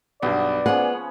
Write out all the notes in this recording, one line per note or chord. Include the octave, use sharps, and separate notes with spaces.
B1 G2 B3 D5
F3 B3 C#4 G#4 F#5